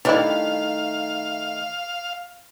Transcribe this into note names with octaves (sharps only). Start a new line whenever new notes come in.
D#3 G3 A3 D4 E4 F5